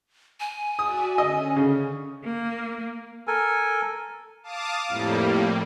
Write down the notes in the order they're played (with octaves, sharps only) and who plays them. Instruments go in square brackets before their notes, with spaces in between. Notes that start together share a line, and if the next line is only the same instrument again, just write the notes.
[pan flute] G#5
[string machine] F#4 D5 E5 [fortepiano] D#6
[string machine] D3 C#4 [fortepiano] D#5
[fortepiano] C#3
[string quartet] A#3
[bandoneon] A4 A#4 G#5
[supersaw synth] F5 A5 D6 D#6
F2 A2 G3 A#3